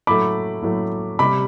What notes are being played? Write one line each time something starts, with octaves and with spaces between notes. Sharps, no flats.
A2 F#3 A3 B5 D6
A2 F#3 A3
C3 G3 B5 D6